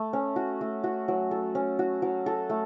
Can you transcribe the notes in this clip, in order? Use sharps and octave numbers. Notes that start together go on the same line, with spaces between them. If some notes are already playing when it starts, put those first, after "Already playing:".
Already playing: A3
C#4
F#4
A3
F#4
F#3
A4
C#4
F#4
F#3
A4
A3